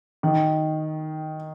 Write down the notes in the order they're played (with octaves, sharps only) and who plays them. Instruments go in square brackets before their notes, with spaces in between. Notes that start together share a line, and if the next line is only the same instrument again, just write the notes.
[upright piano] D#3